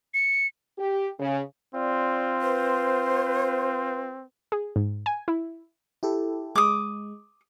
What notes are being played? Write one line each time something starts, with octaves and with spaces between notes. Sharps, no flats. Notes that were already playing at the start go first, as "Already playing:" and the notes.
C#7
G4
C#3
C4 F4 D5
B4 C5
G#4
G#2
G#5
E4
E4 G4 A4
G#3 D6 D#6